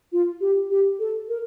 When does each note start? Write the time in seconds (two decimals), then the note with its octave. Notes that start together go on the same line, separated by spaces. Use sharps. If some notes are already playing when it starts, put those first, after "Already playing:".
0.12 F4
0.41 G4
0.70 G4
0.99 A4
1.29 A#4